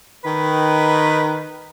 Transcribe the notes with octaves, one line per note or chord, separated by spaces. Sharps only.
D#3 B4